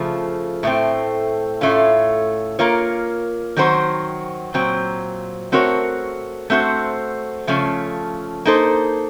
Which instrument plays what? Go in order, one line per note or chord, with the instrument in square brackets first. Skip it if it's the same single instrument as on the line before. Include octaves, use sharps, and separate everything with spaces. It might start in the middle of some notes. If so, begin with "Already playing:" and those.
Already playing: [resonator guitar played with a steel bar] C#3 F3 A3
A2 A3 C4
A2 A3 C#4 F4
A#3 F4 A#4 C#5
D#3 F#3 C4 F#4 C5
A#2 F#3 C4
A3 C4 F#4 A#4 C#5
A3 C4 F#4 C5
C#3 F3 A3 C#4
A#3 D#4 A4 C5